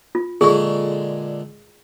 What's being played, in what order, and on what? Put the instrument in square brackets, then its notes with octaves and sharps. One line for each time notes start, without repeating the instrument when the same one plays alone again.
[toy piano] F4
[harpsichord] A#2 D3 G#3 [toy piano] G#4 C#6